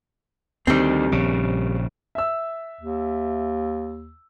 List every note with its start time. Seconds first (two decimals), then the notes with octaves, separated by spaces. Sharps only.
0.67 D2 D#3 G3 C4
1.12 A#1 C#3
2.15 E5 E6
2.81 D#2